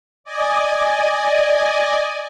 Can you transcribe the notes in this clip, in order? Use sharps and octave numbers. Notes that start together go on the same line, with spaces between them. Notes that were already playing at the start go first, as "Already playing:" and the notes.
D5 D#5 G#5